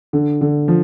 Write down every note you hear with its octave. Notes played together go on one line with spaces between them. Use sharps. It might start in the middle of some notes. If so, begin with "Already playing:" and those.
D3
D3
F3